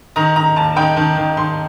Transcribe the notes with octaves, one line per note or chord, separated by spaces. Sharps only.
D#3 A#5
D#3 A#5
D#2 A5
D#3 G5
D#3 A5
D#3
D#3 C6